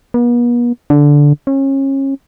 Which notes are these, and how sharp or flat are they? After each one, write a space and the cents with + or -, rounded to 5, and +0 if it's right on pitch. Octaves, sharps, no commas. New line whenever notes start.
B3 -45
D3 -10
C#4 -30